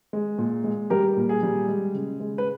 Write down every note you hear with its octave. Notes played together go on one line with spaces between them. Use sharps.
G#3
A#2
G#3
G3 G4 A#4
A#2
G#4
G3
G#3
C#3
G#3
B4